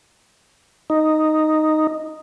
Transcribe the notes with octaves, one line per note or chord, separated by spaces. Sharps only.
D#4